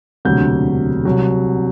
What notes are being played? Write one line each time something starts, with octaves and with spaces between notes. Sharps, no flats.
E1 D2 C3 F#3 G6
C2 C3 F#3